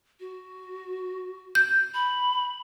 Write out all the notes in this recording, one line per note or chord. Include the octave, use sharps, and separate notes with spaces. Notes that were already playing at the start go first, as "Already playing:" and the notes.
F#4
G6
B5